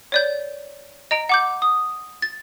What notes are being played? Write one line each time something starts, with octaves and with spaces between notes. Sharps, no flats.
C#5 D5 G6
D#5 A#5 D7
F#5 D6 G6
D#6
A6